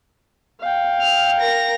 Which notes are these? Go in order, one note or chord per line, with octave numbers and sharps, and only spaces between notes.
F5 G5
F6
A#4 A#6